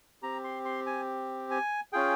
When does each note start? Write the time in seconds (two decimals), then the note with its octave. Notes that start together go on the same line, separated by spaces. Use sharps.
0.23 C4 G4 A#5
0.44 C6
0.65 C6
0.86 G#5
1.51 G#5
1.93 C#4 F4 G#4 G5